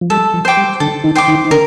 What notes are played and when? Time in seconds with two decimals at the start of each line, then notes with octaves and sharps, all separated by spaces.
0.01 F3
0.10 G3 A4
0.34 F3
0.45 C5 G5 D6
0.57 G3
0.80 D3 D4 A4
1.04 D#3 D#4
1.16 C5 G5 D6
1.28 D#3 D#4
1.45 D#4
1.51 D3 D4 A#4